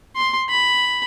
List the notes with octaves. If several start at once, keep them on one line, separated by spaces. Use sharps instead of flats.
C6
B5